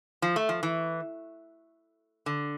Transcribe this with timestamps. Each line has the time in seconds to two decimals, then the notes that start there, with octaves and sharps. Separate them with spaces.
0.22 F3
0.36 A3
0.49 F3
0.63 E3
2.26 D3